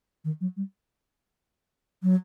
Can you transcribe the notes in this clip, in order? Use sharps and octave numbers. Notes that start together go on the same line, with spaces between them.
D#3
F#3
G3
F#3